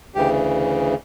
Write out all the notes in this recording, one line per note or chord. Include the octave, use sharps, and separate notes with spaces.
D2 C#3 E3 G4